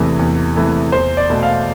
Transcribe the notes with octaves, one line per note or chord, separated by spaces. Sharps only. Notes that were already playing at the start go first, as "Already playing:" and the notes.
Already playing: E2 C3 E3 A3
E2
C3 E3 A3
E2 C5
D5
B2 A3
F5